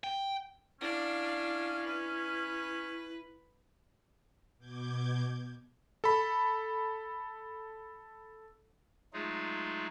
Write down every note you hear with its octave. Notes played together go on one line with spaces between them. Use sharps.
G5
C#4 D4 E4 F5
B4
B2 D6 G6 G#6
A4 B5
F#3 G#3 A3 D#4 F4 G#4